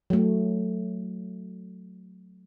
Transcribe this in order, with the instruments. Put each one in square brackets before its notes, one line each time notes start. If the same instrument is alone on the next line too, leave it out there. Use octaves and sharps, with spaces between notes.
[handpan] F#3 A3